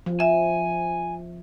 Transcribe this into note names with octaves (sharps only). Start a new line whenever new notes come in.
F3
E5 G#5